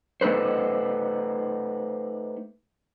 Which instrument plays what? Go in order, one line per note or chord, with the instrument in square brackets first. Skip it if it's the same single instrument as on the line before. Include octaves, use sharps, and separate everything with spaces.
[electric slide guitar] A3 D#4 A4 B4 C5